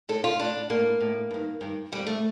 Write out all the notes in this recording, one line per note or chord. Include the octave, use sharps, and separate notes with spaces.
A2 A4
F4
A2 D4
A2 A#3
A2
G2 D#3
G2 D#3
F2 D3 G3
A3